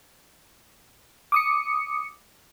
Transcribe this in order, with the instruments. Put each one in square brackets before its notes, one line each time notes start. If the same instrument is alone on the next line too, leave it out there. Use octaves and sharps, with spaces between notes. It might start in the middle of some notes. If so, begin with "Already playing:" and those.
[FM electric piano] D6 D#6 C#7